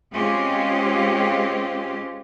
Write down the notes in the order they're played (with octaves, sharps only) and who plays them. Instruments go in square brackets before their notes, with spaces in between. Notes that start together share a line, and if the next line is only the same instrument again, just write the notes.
[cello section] G#3 C4 C#4 F4 G4